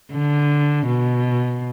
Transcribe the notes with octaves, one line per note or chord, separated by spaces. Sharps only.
D3
B2